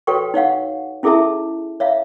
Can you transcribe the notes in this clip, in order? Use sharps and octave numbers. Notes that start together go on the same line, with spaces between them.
F#4 A4 B4 C#5 G5 C#6
D#4 C#5 F5 F#5
C#4 E4 G#4 A4 E5 A5
C#5 E5 F5